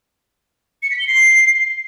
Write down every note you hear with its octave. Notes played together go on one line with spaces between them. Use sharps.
C#7
B6
G7
C7